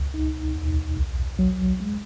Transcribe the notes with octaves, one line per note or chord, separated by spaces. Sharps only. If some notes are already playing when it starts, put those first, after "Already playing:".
Already playing: C#2
D#4
D#2
B1
F#3
G#3